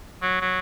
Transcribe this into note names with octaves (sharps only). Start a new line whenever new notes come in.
F#3
F#3